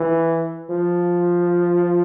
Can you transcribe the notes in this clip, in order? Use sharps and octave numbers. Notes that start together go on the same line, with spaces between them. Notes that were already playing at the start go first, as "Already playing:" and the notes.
Already playing: E3
F3